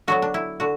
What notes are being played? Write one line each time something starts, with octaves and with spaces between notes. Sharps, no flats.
D3 F#3 B3 F#4
D4
E4
D3 F#4